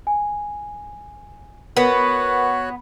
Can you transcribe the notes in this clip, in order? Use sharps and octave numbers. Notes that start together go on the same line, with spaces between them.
G#5
B3 F#4 A#4 B4 C#5 B5 F#6